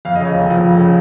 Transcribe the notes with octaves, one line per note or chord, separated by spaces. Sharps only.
F2 F5
D#5
C#3
C#5
F1
F3
F2
C#3